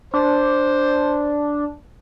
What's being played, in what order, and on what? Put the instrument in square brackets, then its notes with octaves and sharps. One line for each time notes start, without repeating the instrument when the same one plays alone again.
[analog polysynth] D4 [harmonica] C5